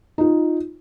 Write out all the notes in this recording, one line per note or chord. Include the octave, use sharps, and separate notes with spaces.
D#4 F4